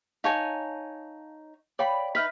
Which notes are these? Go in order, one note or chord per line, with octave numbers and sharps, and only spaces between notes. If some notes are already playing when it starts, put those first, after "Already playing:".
D#4 C#5 F5 G#5 A5
C#5 D5 F5 G5 B5
D#4 B4 E5 B5 F6 B6